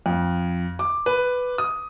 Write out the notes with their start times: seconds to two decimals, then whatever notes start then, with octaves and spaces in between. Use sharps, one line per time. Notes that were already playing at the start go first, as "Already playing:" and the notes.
0.06 F2
0.79 D6
1.06 B4
1.58 D#6